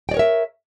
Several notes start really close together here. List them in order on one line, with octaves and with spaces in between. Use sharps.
G5 D5 C#5 A#4 E5